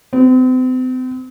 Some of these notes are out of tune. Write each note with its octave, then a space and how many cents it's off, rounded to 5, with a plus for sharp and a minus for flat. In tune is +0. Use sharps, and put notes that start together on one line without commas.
C4 -40